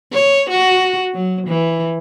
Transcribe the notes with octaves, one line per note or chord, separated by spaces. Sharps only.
C#5
F#4
F#3
E3